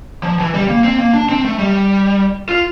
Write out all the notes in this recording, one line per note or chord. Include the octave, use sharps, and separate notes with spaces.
F3
E3
G3
A#3
C4
A#3
D4
C4
A3
G3
F4